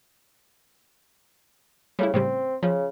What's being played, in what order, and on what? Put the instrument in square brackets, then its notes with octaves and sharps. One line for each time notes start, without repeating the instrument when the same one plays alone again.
[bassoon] C#3 [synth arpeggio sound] G3 A3 E4
[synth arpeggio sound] A2 C#3 G3 [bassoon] C4
[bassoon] C#3 [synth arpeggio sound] F3